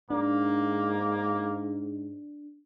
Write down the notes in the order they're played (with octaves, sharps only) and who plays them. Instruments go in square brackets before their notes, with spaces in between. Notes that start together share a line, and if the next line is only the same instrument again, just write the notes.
[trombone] G#2 [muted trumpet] A#3 [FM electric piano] D4